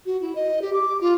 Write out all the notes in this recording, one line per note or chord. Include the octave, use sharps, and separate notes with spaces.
F#4
E4
D#5
G4
D6
F4